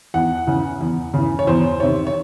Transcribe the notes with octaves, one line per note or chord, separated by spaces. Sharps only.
E2 F#5
C#3 E3
E2
C#3 E3
C#5
E2 C5
C3 D#3 C#5
C#5